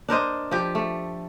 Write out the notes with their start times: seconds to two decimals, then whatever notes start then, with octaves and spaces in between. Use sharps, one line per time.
0.09 D4 A#4 C5 D#5
0.51 F3 G4
0.75 A3